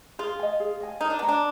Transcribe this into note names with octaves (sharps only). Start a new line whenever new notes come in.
F4 G#4
D#5 G#5
G#4
D#5 G#5
D#4 A#4
D4
B3 D#5 A#5
D4